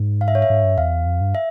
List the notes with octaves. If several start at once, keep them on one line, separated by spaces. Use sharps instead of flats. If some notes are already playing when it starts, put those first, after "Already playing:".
Already playing: G#2
F5
E5
C#5
E5
G#2
G2
E2 F5
F2
G2
E5